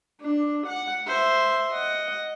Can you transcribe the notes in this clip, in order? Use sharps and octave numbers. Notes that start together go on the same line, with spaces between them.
D4
F#5
C5 E5
D#5 F#5